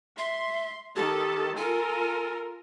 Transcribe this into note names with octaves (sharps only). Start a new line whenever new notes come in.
E5 C6
D#3 G4 A4 A5
F4 A4 A#4 G#5